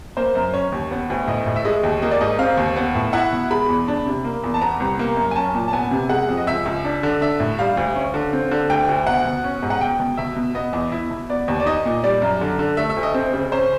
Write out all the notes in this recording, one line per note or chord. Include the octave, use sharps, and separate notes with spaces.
A#3 C5
F#2
C#4 C#5
D#2
B3
D2
A2 D#5
A2
E5
G#3 D#5
D#2
A#3 D#5
D5
G#2 D#5
C4 F5
D#2
B3
A2
E4 F#5
B2
G#3 B5
E2
D4
C3
A#3
E2
A5
B3 A#5
C2
A#3
F#2
G#5
C#4 A5
A#2
A5
B3 G#5
C3
G#3 F#5
F2
D#5
C#2 E5
C#2
D4
D3
D4 E5
A2
G3 F5
D2
C#4
D3
C4
D3
D2 G5
D2
B2 F#5
B2
C#4
G#2
F#5
B2 G5
B2
B2 E5
B2
B3 D#5
E2
E4
B2
B3 D5
D#2
D5
D#4 D#5
A#2
G3 D5
F#2
D3
D3
A3 E5
E5
D2
D#5
C4
C#3
C#4 C5